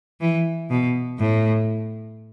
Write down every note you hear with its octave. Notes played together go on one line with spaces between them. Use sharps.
E3
B2
A2